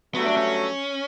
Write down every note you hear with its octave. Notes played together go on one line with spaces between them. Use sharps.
G2 F#3 A3 B3
D4
C#4